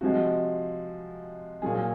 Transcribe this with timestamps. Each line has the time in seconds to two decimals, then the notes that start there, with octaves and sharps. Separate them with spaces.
0.01 C3 F3 G#3 F#4
1.62 A#2 F#3 G#4